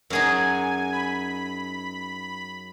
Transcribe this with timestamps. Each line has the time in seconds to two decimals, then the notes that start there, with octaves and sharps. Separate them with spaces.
0.10 F#2 F#3 D#4 G#4 G#5
0.92 B5